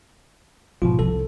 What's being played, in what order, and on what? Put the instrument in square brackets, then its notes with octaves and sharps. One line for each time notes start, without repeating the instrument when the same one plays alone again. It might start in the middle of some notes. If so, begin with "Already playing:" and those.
[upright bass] G#1 [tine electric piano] B2 F3 F4
[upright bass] C2 [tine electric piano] A4